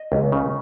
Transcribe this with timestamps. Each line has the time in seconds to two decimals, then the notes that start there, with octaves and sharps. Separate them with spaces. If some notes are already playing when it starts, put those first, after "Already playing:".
Already playing: D#5
0.12 C#2
0.32 C#3